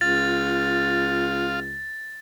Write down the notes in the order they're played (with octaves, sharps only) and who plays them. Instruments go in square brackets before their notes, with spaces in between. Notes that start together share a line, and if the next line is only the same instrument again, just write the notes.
[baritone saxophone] C#2 [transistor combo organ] F4 [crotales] A6